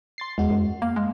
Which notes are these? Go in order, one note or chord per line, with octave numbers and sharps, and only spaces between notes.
C6 A6 C7
E2 G#3 F#4
F#2
A#3 F5
G#3